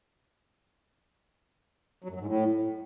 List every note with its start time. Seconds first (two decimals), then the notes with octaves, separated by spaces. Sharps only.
2.04 F#3
2.10 F#2
2.15 F#3
2.21 G#2
2.26 A2